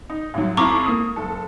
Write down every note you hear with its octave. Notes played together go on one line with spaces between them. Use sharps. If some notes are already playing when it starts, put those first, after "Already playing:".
D#4
A1 F#3
F2 E4 A#5 C#6 D6
A#3 D#6
F#1 A4